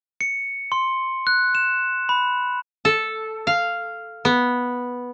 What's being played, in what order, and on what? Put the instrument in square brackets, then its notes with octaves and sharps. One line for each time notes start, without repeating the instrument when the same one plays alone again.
[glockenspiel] C#7
C6
F#6
E7
B5
[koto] A4
F5
B3